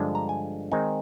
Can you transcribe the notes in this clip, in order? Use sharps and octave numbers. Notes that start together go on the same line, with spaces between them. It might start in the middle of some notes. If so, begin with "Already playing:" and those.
Already playing: G2 D3 F3 G#3 D4
A#5
G#5
D#3 G#3 C4 D#4 G#5